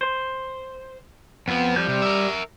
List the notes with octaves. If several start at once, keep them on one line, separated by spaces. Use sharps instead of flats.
C5
F2 F3 B3
G3 G6
C3
A#4 E5